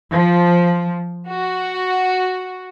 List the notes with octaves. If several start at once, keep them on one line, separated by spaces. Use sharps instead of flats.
F3
F#4